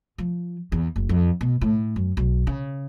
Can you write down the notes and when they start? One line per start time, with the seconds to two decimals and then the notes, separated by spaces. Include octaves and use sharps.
0.18 F3
0.72 E2
0.96 F#1
1.09 F2
1.41 B2
1.61 A2
1.96 F#2
2.17 B1
2.47 C#3